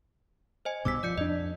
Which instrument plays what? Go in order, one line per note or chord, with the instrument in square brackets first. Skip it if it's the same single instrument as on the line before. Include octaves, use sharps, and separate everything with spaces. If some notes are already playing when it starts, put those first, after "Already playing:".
[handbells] C5 D#5 G#5
[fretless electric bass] B1 G2 B2 [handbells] D6 E6 B6
[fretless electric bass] F3 [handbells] D5 G6 C#7
[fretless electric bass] F2 D4 [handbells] D#5